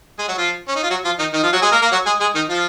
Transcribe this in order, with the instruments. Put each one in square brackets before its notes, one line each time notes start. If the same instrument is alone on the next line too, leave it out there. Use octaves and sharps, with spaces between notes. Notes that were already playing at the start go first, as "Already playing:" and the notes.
[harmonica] G#3 G#4
F#3 F#4
F3 F4
C#4
D#4
F4
F#3 F#4
F3 F4
D#3 D#4
D#3 D#4
F3 F4
F#3 F#4
G#3 G#4
A#3 A#4
A#3 A#4
F#3 F#4
G#3 G#4
G#3 G#4
D#3 D#4
F3 F4